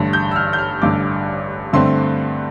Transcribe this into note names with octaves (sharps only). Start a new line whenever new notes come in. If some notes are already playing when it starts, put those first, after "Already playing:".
Already playing: A1 G2 D3
G6
E6
F6
G6
F6
A1 G2 D3 D6
G2 D3 A3 C4 C6